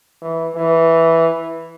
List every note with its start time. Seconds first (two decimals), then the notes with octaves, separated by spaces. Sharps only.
0.22 E3
0.56 E3